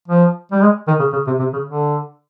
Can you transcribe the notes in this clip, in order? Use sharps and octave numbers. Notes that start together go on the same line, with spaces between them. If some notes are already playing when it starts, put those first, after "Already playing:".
F3
G3
G#3
D#3
C#3
C#3
C3
C3
C#3
D3